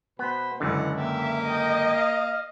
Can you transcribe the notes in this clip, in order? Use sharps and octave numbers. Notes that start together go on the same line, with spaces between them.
B2 B3 C5 B5
C#2 F#2 D3 E3 D#5 F#5
A#3 G4 E5
G4 D#5 G5
F5